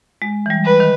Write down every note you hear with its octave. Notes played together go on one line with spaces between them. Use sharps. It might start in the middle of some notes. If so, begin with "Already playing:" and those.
G#3
E3
G3
B4
D#3